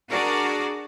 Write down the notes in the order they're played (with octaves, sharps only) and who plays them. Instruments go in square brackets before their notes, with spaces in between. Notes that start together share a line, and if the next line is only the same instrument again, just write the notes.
[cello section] D4 F#4 G#4 A#4 D5